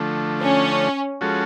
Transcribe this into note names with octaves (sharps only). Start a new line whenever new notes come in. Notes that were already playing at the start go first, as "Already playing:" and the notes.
Already playing: D3 F3 A3
C#4
F3 G#3 C#4 F#4 A4